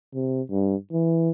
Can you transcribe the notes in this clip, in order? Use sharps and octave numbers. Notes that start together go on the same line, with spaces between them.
C3
G2
E3